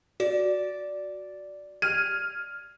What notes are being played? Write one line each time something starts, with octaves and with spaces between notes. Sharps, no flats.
F#4 D5
F6 G#6 D#7